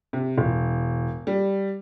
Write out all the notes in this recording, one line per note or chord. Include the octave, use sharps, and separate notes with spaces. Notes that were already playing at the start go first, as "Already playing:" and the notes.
C3
E1
G3